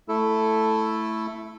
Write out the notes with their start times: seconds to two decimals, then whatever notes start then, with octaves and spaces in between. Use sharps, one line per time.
0.08 A3 E4 A4